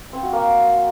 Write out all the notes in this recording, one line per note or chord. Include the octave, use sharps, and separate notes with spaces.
C4
F#4
A#3